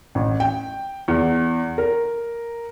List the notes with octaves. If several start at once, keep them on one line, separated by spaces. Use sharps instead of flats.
A1
G5
E2
A#4